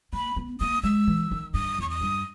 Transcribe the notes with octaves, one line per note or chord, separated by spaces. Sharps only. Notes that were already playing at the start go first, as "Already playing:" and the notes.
A#3 B5
B3
A#3 D#6
G#3 E6
E3
D#3
G2 D#6
E2 C#6
D#6
G2